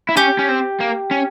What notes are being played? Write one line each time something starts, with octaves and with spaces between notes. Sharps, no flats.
E4
C#4 G4
C#4
C4
A#3
C#4